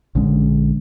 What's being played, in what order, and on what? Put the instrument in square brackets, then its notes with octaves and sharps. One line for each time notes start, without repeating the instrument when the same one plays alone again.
[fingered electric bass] A#1 D3 G#3 C#4